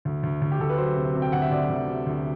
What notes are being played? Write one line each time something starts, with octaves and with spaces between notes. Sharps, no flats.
D2
D2
D2
G4
D2 A4
B4
F#3 C5
C3
C3
G5
D2 F#5
E5
D2 D5
D2
C3
D2